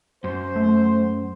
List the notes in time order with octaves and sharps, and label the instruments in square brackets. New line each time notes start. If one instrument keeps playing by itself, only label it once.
[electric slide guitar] F#2 [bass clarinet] C5
[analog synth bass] A3